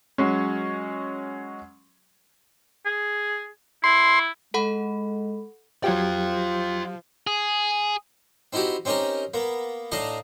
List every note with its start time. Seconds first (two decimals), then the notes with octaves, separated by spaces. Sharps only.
0.18 F#3 G#3 C#4
2.86 G#4
3.84 E4 C6
4.54 G#3 A4 F#5 B5
5.84 F3 F#3 F4 G4 G5
7.27 G#4
8.53 C4 D#4 E4 F#4 G4
8.85 C4 C#4 D#4 G4 A#4
9.34 A#3 B3
9.92 A2 D4 D#4 D#5 F5 A#5